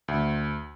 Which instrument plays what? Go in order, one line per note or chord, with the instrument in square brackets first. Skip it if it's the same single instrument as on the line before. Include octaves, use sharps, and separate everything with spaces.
[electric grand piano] D2